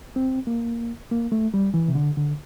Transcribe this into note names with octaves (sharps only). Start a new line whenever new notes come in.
C4
A#3
A#3
A3
G3
E3
C3
D3
D3